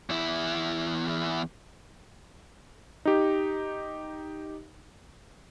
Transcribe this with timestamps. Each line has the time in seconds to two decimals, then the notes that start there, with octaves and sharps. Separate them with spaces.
0.10 E2 E4
3.05 D#4 G4